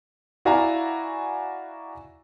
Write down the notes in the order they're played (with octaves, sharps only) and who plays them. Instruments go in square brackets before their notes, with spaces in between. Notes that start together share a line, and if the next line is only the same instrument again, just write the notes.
[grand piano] E4 F#4 D5 F5 G#5 A#5